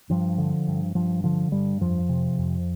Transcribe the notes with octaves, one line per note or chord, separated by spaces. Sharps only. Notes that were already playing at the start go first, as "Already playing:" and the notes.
G2 F3
D3
G2
G2 F3
D3 F3
G2 G3
F2 F3
C3
F2